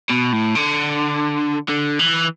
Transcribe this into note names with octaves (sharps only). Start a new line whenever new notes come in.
B2
A2
D3
D3
E3